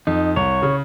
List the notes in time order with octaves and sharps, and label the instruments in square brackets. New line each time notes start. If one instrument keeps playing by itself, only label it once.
[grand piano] F2 [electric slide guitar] D#4
[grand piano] C2 [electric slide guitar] C#5
[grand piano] C#3